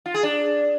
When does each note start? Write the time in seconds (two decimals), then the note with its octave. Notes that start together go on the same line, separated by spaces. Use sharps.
0.06 F4
0.14 G#4
0.23 D4